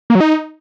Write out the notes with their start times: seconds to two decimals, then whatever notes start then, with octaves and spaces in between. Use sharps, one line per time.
0.10 A#3
0.15 F#3
0.20 D#4